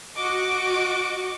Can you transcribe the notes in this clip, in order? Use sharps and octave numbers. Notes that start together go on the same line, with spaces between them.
F#4 D#5 C#6 D6